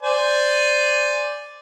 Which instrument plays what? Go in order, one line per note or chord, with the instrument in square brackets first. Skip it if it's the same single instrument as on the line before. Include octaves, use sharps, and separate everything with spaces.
[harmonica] C5 D5 G#5